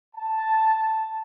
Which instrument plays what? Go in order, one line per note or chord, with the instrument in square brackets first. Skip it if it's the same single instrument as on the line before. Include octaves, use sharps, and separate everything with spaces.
[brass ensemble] A5